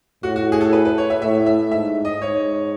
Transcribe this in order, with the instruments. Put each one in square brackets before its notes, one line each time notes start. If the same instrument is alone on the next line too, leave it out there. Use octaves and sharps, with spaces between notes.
[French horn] A2 [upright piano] F#4
[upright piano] F#4
G#4
A4
B4
B4
C#5
E5
[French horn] A2 [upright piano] E5
[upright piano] E5
[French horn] G#2 [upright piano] E5
[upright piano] D#5
[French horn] G#2 [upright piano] C#5